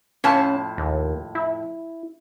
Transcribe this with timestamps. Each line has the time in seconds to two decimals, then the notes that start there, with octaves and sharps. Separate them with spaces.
0.24 F2 A2 C#4 A5
0.78 D#2
1.35 E4